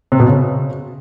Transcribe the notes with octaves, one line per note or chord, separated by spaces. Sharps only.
C3
B2
C#3